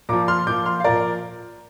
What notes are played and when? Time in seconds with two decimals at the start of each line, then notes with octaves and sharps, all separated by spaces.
0.09 A#2 F3 A#5 D6
0.28 C6 F6
0.47 A#2 F3 D6 G6
0.66 C6 F6
0.80 F5
0.84 A#2 F3 A#4 D5